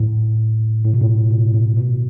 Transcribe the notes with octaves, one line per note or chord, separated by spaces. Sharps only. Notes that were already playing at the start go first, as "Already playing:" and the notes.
Already playing: A2
A2
B2
A2
B2
A2
B2